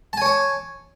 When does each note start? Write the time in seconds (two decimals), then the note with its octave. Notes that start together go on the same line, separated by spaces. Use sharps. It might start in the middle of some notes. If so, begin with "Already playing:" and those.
0.13 A5
0.17 G#5
0.22 C#5
0.26 D6